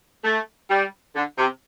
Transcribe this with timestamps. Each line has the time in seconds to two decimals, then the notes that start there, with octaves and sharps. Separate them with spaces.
0.24 A3
0.70 G3
1.15 D3
1.38 C3